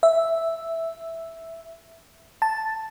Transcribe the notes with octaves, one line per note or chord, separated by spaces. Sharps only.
E5
A5